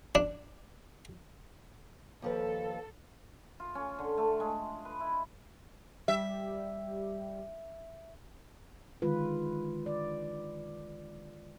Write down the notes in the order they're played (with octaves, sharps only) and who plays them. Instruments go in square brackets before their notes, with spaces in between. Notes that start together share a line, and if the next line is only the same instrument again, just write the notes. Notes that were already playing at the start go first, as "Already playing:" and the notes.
[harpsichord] D4
[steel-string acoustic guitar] D#2 F3 B4 [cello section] A4
[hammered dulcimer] F4
C#4
D3
A3
G#3
B4
E4
[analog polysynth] G3 G4 [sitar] E5
[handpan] D3 D#3 G#3 F4 B4
D5